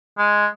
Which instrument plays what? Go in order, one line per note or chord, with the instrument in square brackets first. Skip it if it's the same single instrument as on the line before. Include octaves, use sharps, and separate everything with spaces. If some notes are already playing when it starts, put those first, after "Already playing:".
[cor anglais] G#3